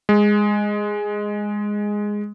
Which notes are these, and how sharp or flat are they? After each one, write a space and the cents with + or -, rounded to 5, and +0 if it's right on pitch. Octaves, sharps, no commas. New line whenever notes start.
G#3 -5